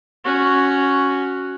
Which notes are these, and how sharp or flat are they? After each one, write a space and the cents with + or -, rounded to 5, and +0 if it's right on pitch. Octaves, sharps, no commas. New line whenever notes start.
C#4 +0 F#4 +0